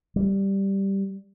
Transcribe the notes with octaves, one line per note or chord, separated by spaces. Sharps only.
G3